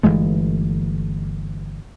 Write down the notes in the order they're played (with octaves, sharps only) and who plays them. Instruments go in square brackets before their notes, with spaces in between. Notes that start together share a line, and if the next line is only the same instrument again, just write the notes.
[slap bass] G1 E3 G#3 A3